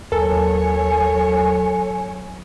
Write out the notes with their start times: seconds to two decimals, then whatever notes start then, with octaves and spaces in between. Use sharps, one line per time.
0.12 D#2 F#3 A4 A#4 C#5 G#5